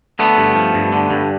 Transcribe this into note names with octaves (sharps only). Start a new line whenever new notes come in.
D3 A3 B3
G2
F3
G2
D3
G2